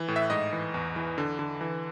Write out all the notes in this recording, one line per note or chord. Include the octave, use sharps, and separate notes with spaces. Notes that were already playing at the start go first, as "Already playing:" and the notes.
Already playing: E3
A2
E5
G#2 D#5
E3
E2
E3
D3
D3
E3